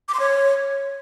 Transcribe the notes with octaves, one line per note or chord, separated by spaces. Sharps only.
D6
C6
C#5